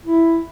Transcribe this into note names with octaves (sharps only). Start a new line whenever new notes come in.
E4